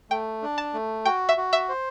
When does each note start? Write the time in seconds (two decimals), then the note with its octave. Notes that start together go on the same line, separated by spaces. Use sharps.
0.10 A3 G5
0.42 D4
0.58 A5
0.74 A3
1.05 F#4 G5
1.29 E5
1.37 F#4
1.53 E5
1.69 C5